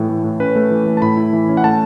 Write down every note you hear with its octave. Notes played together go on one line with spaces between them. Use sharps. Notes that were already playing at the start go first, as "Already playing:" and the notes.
Already playing: A2 E3 E4
A3
A2
C#4 B4
A3
E3
A3
A5
A2 B5
E4
E3
C#4
F#5
A3 A5